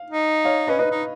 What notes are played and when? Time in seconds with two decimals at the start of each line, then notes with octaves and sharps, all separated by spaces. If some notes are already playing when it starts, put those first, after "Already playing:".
Already playing: F5
0.10 D#4
0.45 C#5 F5
0.67 C#4 B4 D#5
0.79 D#4 B4 D#5
0.91 D#4